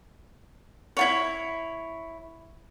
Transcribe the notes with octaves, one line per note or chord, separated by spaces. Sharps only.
E4 F4 C#5